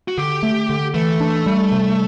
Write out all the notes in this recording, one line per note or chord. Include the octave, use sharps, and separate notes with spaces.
F#4
D3 G4
A3
D3
E3 A3
D4
G3
C3